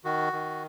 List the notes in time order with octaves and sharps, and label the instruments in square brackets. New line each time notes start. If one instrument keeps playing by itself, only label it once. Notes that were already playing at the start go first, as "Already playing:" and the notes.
[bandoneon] D#3 F#4
D#3